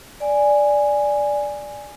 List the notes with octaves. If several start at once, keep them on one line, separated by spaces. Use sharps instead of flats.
D5 G#5